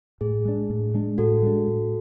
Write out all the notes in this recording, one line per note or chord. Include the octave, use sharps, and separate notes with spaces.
A2 G#4
G#3 D4
A2
G#3 D4
A2 F#4 A4
G#3 D4
A2